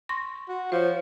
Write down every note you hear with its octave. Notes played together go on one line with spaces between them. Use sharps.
C6 C#6 A#6
F#4
F3 C5 C#5